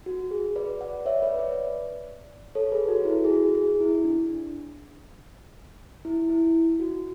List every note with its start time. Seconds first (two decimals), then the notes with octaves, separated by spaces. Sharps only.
0.06 F#4
0.31 G#4
0.56 B4 D5
0.81 D5 F#5
1.06 C#5 E5
1.22 B4 D5
1.39 B4 D5
2.55 A4 C#5
2.72 G#4 B4
2.88 F#4 A4
3.05 E4
3.25 G#4
3.30 F#4
3.55 G#4
3.80 E4
4.05 D4
6.05 E4
6.30 E4
6.80 F#4